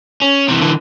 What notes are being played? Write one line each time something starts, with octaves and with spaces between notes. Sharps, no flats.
C#4
C3 E3
D3 E3